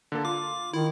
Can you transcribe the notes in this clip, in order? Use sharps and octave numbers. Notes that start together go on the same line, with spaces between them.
D3 A#3 A4
F4 D6
D#3 E4